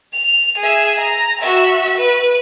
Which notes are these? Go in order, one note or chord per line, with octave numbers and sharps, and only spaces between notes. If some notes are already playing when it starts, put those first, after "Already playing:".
F7
G#4 E5
A#5
F#4 E5
B4